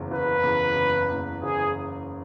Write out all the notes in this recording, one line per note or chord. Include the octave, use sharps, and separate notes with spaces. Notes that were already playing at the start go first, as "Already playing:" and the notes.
Already playing: F#1 E2 C#3
F#1 B4
E2 C#3
F#1
E2 C#3
F#1 G#4